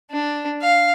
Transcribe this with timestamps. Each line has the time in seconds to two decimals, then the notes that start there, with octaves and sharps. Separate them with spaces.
0.11 D4
0.62 F5